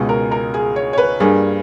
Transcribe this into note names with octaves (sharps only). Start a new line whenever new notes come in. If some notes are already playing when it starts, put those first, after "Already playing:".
Already playing: C#2 B2 G#3 C#4 G#4
A#4
A#4
G#4
C#5
C#5
B4
G2 G3 A#3 G#4